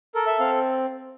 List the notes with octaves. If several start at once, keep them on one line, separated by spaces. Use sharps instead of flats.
A4 A#4
E5
C4 F5